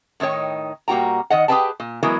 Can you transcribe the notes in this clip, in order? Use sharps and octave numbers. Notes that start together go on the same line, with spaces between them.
A2 D#3 D#4 C#5 G5
A#2 G3 A#3 F#4 G5 A#5
D#3 D#5 F#5
G4 G#4 A#4 B4 G5 A5
A#2
E3 F#3 G#3 B3 E4 A#4